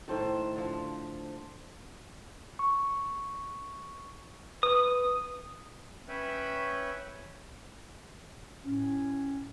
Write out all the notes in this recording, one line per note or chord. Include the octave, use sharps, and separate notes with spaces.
A2 D#3 A4 C5
D3 F3
C#6
B4 D#6
C#4 B4 C#5 E5 G5 B5
A2 C#4